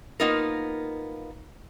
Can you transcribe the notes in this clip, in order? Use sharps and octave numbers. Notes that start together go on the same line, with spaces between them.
A#3 B3 D#4 F4 A#4